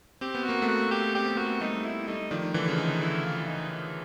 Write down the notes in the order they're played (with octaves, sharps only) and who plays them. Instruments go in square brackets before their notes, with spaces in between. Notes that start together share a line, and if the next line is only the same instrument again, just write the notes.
[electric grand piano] C4 [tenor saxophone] G4
[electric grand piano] B3
[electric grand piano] A#3 [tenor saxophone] F#4
[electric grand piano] A3 B3
[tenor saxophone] F#4
G4
[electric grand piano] C4 [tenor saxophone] G4
[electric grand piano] B3
[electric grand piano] A#3 [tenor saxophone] F#4
[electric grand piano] A3 B3
[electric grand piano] G3 A3 [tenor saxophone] D#4
[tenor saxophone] E4
[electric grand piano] G3 A3 [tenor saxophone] D#4
[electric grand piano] D#3 F3 [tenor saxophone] D4
[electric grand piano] D3 E3 [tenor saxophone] D4
[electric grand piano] C#3
[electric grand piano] D3 [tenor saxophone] D#4
[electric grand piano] D3 [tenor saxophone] E4
[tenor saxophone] F4
D#4